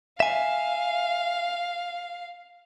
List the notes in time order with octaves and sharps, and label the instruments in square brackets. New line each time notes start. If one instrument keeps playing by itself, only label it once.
[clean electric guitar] E5 G#5 [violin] F5